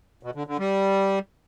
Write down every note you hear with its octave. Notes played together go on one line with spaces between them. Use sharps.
B2
D3
D3
G3